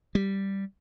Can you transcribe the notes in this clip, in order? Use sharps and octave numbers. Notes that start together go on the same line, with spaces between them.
G3